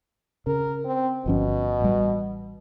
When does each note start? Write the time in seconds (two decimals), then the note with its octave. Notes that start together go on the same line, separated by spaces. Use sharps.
0.47 C#3 A#4
0.85 C4
1.26 G1 B2 F3 C#4
1.80 A1 G3